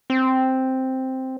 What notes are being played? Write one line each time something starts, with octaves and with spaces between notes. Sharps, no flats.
C4